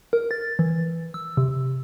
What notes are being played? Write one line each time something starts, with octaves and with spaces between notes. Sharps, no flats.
A#4
A6
E3
E6
C3